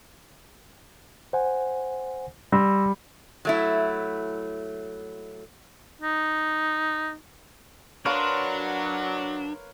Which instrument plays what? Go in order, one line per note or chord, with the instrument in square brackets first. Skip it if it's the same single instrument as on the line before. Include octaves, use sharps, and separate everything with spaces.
[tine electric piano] C5 F#5 G#5
[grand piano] G3 [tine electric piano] C6 E6 A#6
[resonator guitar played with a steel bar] F#3 A3 E4
[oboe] D#4
[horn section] F#3 [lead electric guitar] D4 [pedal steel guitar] A#4 B4 [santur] C#5 F5 C6